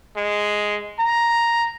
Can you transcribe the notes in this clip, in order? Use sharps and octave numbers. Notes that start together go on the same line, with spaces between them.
G#3
A#5